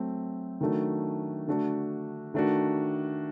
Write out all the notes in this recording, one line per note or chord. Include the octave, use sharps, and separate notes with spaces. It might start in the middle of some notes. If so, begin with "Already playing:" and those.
Already playing: F#3 A3 C4
D#3 F#3 A3 D4 F#4
D3 A3 D4 F#4
D#3 A3 D4 F#4